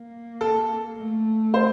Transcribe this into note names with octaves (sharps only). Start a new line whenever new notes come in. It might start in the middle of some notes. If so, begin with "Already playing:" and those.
Already playing: A#3
A4
A3
C5